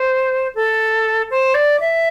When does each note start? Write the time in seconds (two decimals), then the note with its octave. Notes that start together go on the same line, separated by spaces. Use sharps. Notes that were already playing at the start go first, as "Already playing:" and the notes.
Already playing: C5
0.55 A4
1.31 C5
1.54 D5
1.80 E5